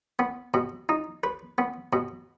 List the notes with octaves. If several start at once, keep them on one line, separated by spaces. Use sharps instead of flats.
B3
B2
D#4
B4
B3
B2